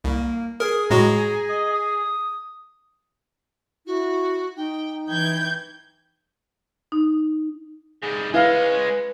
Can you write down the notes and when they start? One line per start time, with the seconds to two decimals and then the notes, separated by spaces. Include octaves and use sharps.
0.04 C2 A#3
0.60 G#4 A#4 D#6
0.90 A2 G#3 F#4 A#5
1.49 D#5
1.73 D#6
3.86 E4 F#4
4.57 D#4 G5
5.08 E3 G5 G6 G#6
6.92 D#4
8.03 G#2 G3 G#4
8.34 G#3 C#4 E4 B4 F5